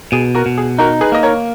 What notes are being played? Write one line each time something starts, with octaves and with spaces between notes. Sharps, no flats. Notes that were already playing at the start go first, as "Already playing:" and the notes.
B2 G#4
F#4 A#4
B2
G#4
D#4 F#4 A#4
G#4 B4
A#3 D#5
A#4 C#5